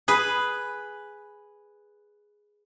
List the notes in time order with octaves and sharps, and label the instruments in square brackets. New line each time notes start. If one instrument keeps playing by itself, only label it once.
[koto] G#4 B4